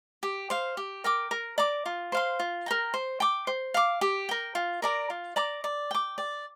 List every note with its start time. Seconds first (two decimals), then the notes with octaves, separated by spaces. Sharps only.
0.23 G4
0.50 C5 F5
0.77 G4
1.04 A#4 G5 D6
1.31 A#4
1.58 D5 A#5 D6
1.86 F4
2.12 C5 F5 C6
2.39 F4
2.66 A#4 G5 A#5
2.94 C5
3.20 G5 D6
3.47 C5
3.74 F5 D6
4.01 G4
4.29 A#4 G5
4.55 F4
4.82 A#4 D5 A#5
5.10 F4
5.36 D5 A#5 D6
5.64 D5
5.91 G5 D6
6.18 D5